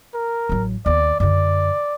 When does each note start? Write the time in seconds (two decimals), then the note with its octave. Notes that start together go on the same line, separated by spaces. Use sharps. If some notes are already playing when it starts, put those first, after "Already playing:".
0.14 A#4
0.49 A1 F#3
0.86 D#2 B3 D5
1.20 F#2 D3 D5